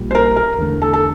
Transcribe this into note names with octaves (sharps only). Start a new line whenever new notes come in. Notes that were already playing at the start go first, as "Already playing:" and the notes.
Already playing: A#1 A#2 G3
C5
A#4
A#4
E2 D3 A3
A4
A4